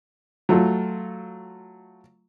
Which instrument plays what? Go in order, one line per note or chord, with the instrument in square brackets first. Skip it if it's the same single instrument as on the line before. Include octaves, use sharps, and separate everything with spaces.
[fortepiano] F#3 A3 F4